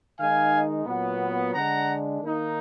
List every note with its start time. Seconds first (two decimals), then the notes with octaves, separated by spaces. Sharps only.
0.19 D#3 G#3 D#4 F5 G#5
0.87 A#2 F#3 B3
1.54 D3 G#3 D4 F#5 A#5
2.22 D#3 A#3 D#4